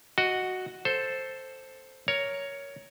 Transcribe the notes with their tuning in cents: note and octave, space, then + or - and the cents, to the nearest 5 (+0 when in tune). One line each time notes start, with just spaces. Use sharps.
F#4 +0 D#5 +0
A4 +0 C5 +0
A#4 +0 C#5 +10